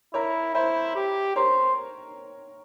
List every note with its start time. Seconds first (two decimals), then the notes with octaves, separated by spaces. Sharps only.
0.14 E4 A#4 C#5
0.55 E4 C5 E5
0.95 G4
1.36 A#4 C5 C#5